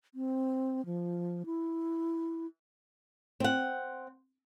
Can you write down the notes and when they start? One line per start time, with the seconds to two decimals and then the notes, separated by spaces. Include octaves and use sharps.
0.15 C4
0.86 F3
1.46 E4
3.40 C4 F#5